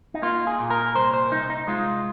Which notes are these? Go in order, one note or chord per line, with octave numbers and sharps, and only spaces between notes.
D#4
A#3 F4
G#4
A#2
A#4
C2 C5
C5
C2 D#4
D#4
G#3 F4